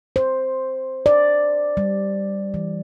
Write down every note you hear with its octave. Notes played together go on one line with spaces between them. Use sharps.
C5
D5
G3
E3